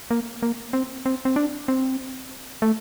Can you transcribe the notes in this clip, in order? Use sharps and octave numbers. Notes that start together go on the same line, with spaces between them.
A#3
A#3
C4
C4
C4
D4
C4
A3